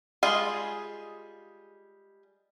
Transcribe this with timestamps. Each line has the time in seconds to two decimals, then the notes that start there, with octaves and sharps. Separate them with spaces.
0.23 G3 G#3 F4 G#4